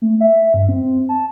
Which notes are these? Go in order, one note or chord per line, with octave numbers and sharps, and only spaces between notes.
A3
E5
G2
C4
A5